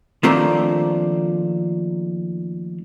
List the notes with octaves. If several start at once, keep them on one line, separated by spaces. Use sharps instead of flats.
D#3 F3 A3 A#3 C4 D4